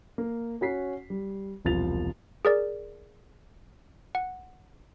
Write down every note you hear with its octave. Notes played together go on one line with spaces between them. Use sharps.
A#3
C#4 F#4 B6 C7
G3
E1 C2 F3 A6 F7
G#4 A#4 D5
F#5